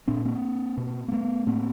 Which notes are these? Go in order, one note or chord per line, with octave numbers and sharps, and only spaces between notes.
A#2 C4 D4
A#3 C4
B2
A#3
A3 B3
A2 A#3 C4